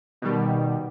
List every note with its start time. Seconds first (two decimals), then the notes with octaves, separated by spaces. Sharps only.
0.22 B2 D#3 G3